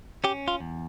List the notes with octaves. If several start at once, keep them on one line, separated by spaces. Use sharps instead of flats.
C#4 G4
F4
E2